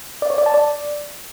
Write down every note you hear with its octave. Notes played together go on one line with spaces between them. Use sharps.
D5
C#5
D5
A5
D5